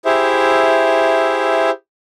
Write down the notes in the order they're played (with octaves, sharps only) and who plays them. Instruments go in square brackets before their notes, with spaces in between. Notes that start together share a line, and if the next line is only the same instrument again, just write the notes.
[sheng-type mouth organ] E4 G4 G#4 C5 E5